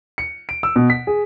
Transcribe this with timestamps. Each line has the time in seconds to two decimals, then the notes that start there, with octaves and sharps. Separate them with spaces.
0.18 C#7
0.49 D7
0.63 E6
0.76 B2
0.90 B6
1.07 G#4